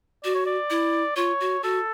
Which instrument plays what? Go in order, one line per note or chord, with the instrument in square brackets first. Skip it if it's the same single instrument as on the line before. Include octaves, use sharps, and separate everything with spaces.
[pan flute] F#4 [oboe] D5
[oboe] C#5
D5
[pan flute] E4
[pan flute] F4 [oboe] C#5
[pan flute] F#4
[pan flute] F#4 [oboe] A4